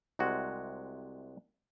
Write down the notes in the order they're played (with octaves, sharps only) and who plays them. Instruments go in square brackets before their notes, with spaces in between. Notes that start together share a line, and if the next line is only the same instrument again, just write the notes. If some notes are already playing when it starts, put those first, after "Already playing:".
[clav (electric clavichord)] C2 C3 G#3 F#4